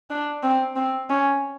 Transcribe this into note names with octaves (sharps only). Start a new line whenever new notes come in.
D4
C4
C4
C#4